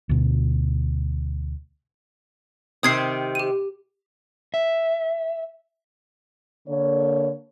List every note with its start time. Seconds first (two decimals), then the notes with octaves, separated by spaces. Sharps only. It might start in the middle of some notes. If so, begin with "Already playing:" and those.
0.09 D2 B2
2.83 C3 D#3 C4 D#6 G#6 C7
3.35 G4 D#7
4.54 E5
6.68 D3 A#3 C#5